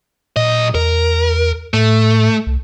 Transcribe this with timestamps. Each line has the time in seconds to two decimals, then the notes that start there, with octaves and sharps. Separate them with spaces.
0.37 B1 A#2 D#5
0.75 E2 A#4
1.74 A2 A3
2.47 C2